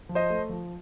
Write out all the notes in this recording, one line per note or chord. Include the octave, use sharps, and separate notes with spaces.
F3
C5 D#5
A3
F3